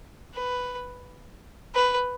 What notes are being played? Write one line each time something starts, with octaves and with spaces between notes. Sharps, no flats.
B4
B4